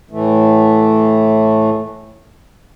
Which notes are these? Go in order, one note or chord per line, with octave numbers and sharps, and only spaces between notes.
A2 E3 A3